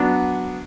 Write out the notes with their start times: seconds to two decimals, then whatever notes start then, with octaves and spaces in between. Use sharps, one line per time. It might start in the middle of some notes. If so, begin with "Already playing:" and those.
Already playing: F#3 B3 D4 F#4